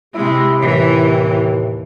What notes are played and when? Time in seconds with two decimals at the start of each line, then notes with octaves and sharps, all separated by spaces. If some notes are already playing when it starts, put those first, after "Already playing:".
0.14 C3 G#3 E4 G4
0.59 D#2 A2 C3 E3